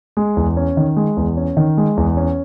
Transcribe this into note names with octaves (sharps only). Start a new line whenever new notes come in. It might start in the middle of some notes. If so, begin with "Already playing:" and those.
G#3
E2
C#4
D#3
G#3
E2
C#4
D#3
G#3
E2
C#4